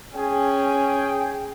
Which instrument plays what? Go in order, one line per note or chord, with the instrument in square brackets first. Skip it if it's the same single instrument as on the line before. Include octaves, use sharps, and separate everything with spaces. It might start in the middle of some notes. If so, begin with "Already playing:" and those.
[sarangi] C#4 [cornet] G#4 [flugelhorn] G5